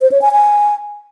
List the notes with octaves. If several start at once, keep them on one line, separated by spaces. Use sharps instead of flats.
C5
C#5
G#5
G#5